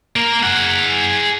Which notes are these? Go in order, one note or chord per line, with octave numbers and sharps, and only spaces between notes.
A#3 A#4
G#4 F#5